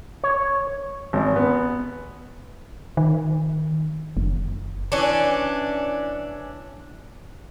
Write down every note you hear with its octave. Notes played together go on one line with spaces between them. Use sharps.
C#5
G#1
B3
D#3
F#1
E3 C#4 D4